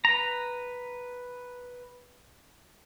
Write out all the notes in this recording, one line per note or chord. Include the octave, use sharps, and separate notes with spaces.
B4 A#5